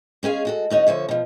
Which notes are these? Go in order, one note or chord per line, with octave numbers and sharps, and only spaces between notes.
G#3 C#4 G#4 F5
G#3 F#4 A4
D#2 C#4 D#4 F#4
D3 F3 C#5 E5
B2 F3